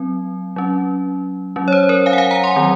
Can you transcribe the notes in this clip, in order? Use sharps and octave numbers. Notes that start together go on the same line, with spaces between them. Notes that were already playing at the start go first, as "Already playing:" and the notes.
Already playing: F#3 C4
F#3 C#4
F#3 C#4
C#5
C5
A#4 C#5
F5 G#5
F#5
F5 G#5
F#5 A#5
G#5 C6
D#3 F#3 C4